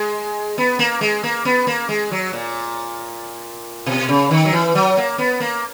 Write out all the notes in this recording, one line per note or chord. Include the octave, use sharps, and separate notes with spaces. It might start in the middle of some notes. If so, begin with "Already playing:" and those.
Already playing: G#3
B3
A#3
G#3
A#3
B3
A#3
G#3
F#3
A#2
B2
C#3
D#3
F#3
E3
F#3
A#3
B3
A#3